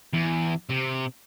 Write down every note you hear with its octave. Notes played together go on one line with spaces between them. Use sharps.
E2
C3